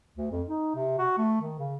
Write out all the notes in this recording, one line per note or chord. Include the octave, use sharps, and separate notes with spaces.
D2
F2
D#4
C3
F#4
A3
D#3
C#3